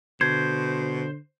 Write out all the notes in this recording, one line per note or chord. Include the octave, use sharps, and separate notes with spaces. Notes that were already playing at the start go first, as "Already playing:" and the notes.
B2 D3 C5 G#6